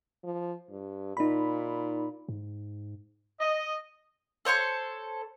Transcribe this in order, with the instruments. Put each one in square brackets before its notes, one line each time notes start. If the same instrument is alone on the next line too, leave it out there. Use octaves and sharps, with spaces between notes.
[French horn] F3
G2
[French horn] A#2 [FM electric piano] D#4 B5
[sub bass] G#2
[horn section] D#5
[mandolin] A4 C5 C#5 C6